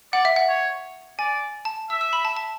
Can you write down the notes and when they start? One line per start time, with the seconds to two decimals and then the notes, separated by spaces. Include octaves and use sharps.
0.13 D5 F#5
0.25 E5
0.36 F#5
0.49 C#5
1.19 D5 G#5
1.65 A5
1.90 E5 E6
2.01 E6
2.13 B5
2.25 A5
2.37 A5